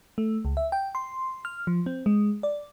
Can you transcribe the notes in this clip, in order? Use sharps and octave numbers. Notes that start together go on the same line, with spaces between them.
A3
C#2
E5
G5
C6
F6
F3
C4
G#3
D5